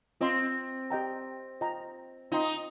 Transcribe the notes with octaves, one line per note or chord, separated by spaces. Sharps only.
C4 F4 D#5 C6
G4 D#5 G5 A#5
F4 D#5 G5 A#5
D#4 F4 D#5 G5 C6